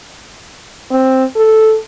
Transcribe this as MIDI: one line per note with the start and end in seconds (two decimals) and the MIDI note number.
0.91 1.24 60
1.36 1.76 69